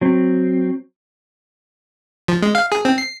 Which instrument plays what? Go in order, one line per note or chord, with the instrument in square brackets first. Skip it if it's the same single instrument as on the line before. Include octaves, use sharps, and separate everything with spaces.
[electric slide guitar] F#3 C4
[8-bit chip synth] F3
G#3
F5
G#4
C4
C7